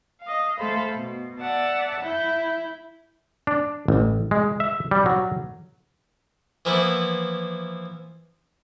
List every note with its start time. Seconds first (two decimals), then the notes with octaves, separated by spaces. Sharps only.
0.22 D#5 F5
0.58 A3 A4 C5 F5 B5
0.94 B2
1.40 D5 E5 F#5 A5
2.01 E4 G6
3.47 D4
3.88 A1
4.31 G#3
4.60 E5
4.91 G3
5.06 F#3
6.65 E3 F3 A#3 B3 E4